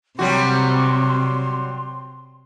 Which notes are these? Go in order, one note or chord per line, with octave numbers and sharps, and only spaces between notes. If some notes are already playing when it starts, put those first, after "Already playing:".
C3 F#3 G3 F#4 C6